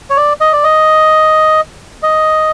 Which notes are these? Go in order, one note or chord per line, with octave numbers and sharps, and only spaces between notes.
C#5
D5
D#5
D5
D#5
D#5